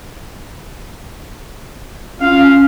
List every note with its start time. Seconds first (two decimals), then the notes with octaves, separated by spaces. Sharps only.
2.21 C#4 F4 F5